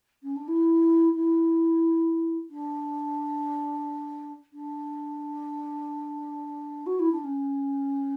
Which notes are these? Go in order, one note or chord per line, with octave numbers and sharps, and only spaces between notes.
C#4
D4
E4
E4
D4
D4
F#4
E4
D4
C#4